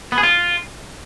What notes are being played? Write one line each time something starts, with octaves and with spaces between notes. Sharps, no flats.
B3
G#4
F4